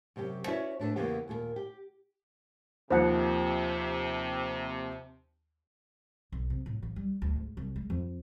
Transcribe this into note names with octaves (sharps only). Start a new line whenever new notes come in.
F#2 C3 C#4 G4
C#4 E4 F#4 B4 C#5 D5
A2 D4 A4 B4
E2 C#3 E3 A#3 B3 G4
D#2 A#2 A4 A#4
G4
D#2 C3 F3 C5 F#5
B1
C3
A2
A1
G3
D2
G#2
C2
G#3
F2